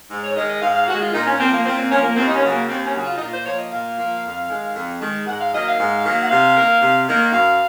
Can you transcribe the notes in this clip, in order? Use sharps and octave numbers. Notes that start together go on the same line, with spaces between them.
G#2
C#5
D#3 G#3 D#5
D#5
G#2 F5
F5
D#3 G#3 F#4
F4
A#2 D#4
C#4
F3 A#3 C4
A#3
A#2 C4
C4
F3 A#3 C#4
A#3
D#2 C4
D#4
C#4
C#3 F#3
A#3
D#2 C4
C#4
C#3 F#3
F4
D#4
A#2 F4
C5
F3 A#3 C#5
D#5
A#2 F5
F3 A#3
F2
D#3 G#3
F2
D#3 G#3
G#2 F#5
F5
D#3 F#3 A#3 D#5
F5
G#2
D#3 F#3 A#3
F#5
C3 F5
D#3 A#3
C3
D#3 A#3
F#2 F5